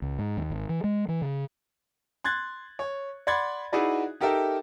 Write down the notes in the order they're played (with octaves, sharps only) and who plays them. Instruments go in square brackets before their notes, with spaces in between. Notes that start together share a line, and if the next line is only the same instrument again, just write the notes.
[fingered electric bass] C#2
G#2
D#2
G#1
E3
G#3
E3
C#3
[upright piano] C6 F#6 G#6 A6
C#5
D5 F#5 B5 C6 G#6 A6
D#4 E4 F#4 G#4 B4 D5
D#4 G4 A4 A#4 E5 G5